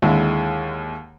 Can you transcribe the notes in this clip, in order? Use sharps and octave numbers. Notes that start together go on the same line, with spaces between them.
D#2 D3 G#3 E4